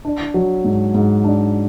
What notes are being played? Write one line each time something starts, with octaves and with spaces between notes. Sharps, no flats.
D4
F#3
G#2
G#2
D4